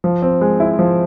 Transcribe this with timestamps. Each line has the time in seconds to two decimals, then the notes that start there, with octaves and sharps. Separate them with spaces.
0.04 F3
0.22 C4
0.41 G#3
0.60 E4
0.79 F3